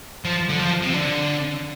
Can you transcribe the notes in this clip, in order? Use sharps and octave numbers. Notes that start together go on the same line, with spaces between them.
F3
D3
F3
C3
D3